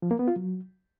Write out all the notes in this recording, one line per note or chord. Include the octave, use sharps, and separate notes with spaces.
F3
A#3
B3
F4
F#3